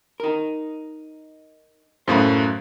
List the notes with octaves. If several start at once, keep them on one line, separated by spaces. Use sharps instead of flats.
D#4 A#4
F#2 A2 A3 C5 F5 B5